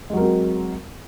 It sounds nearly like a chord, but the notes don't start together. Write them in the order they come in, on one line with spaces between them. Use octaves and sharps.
G#3 F#3 A#4 C4 F#4